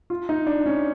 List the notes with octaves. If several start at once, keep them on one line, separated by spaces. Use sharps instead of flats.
F4
D#4
D4
C#4